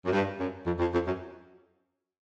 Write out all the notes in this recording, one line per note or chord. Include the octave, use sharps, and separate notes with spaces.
F#2
G2
F#2
F2
F2
F2
F#2